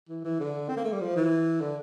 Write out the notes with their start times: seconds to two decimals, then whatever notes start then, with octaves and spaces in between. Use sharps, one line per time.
0.09 E3
0.25 E3
0.40 D3
0.69 C4
0.77 A#3
0.84 A3
0.92 G3
1.01 F3
1.16 E3
1.61 D3